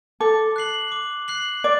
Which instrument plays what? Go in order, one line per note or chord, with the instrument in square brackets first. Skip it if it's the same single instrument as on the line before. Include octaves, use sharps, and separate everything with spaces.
[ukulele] A4 [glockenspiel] D6
[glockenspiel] F#6 C7 F#7
D6
F#6 C7 F#7
[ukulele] D5 [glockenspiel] D6